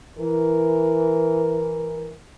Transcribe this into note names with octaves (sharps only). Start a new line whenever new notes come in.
E3 A#4